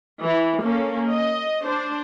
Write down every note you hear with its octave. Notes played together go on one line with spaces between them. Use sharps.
E3
A#3 C#4 A4
D#5
D4 C5